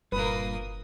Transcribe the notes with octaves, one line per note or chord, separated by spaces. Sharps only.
F#1 G2 A#2 A#3 B4 D#6